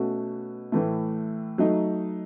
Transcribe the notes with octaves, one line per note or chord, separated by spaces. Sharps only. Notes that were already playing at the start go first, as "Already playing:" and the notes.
Already playing: B2 A3 C#4 F#4
A2 E3 A3
F#3 A3 D#4